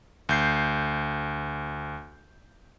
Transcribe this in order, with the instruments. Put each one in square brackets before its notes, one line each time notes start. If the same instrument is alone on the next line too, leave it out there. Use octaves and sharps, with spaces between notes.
[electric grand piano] D2 G6 C7